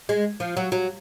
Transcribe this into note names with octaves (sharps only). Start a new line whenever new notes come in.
G#3
F3
F#3
F#3